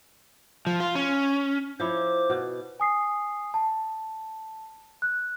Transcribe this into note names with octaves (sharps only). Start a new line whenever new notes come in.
F3
F4
C#4
F3 E4 C5 C#5 D6
B2
G#5 D#6 C7
A5
F#6